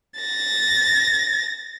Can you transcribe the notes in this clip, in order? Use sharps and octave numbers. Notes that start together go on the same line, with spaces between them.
A6 A#6